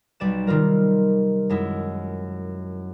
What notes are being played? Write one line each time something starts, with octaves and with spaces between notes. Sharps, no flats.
B1 G3 D5 E7
C3 D#3 G3 F4 A#4
F#2 G#3 E4